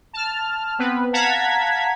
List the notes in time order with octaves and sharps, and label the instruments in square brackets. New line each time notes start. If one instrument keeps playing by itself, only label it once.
[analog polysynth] A5 F6
B3 C4 B4
F5 F#5 A5 A#5 G#6 B6